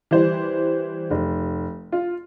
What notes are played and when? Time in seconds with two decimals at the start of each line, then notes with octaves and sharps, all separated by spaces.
0.11 E3 G3 C5
1.11 F1
1.92 F4